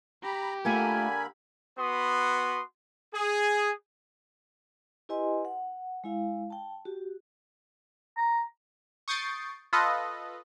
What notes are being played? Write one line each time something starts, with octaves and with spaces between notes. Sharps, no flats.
G4 A#5 B5
D3 A3 A#3 F4 A#4 G#5 B5
B3 F#4 B4 C6 D#6
G#4
E4 G4 B4 D#5 G#5 C6
F#5
G#3 E4 F5
G5 A5
F#4 G4
A#5
C#6 D#6 G6 A6 C7 D7
F4 A4 B4 D#5